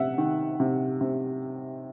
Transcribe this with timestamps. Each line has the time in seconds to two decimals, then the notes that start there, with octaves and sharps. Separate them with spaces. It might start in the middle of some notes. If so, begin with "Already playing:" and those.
Already playing: C3 E5 F#5
0.18 D#3
0.60 C3
1.01 C3